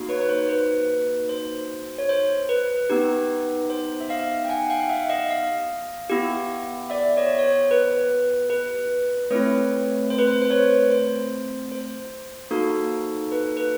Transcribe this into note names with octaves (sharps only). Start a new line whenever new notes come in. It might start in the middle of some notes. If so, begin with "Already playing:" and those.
Already playing: A#3 D#4 F#4
B4 C#5
B4
C5
B4
C5
C#5
C5
B4
B3 D#4 G4
C5
E5
D#5 F5
G5
F#5 G#5
F5 G5
F5
E5 F#5
D#5 F5
D#5 F5
B3 E4 G4
D5 E5
C#5 D#5
C#5
C5
B4
B4
A3 C4 E4 B4 C#5
C5
B4
C5
C5
B4 C#5
C5
C5
A#3 D#4 F#4 A4
B4
B4